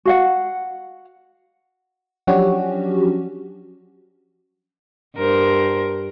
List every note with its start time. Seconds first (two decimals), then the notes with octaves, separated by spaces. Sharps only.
0.05 F#4 F5 F#5
2.27 F3 F#3 C#4 D4 F#4 G4
5.16 G2 A#4 C5